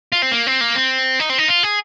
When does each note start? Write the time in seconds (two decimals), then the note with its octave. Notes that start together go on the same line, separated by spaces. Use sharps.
0.12 F4
0.22 C4
0.32 A#3
0.47 C4
0.61 A#3
0.75 C4
1.20 D#4
1.30 C4
1.38 D#4
1.48 F4
1.63 G#4